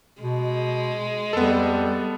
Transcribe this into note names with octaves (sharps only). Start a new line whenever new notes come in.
B2 G#3
F2 G3 B3 A4